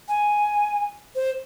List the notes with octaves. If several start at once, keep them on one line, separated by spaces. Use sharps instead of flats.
G#5
C5